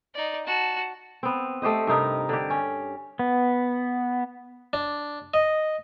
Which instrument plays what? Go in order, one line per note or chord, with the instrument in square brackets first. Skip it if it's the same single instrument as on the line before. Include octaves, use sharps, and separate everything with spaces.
[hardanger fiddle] D#4 D5
F#4 A5
[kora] B3 C4
A3 G4 C5 D#5
G2 C3 D#4 A#4
D3 G4
C#4
[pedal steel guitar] B3
[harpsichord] D4
D#5